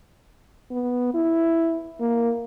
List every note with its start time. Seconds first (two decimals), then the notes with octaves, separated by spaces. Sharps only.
0.71 B3
1.14 E4
2.00 A#3